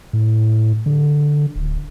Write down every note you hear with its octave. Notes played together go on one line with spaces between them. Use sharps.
A2
D3
D1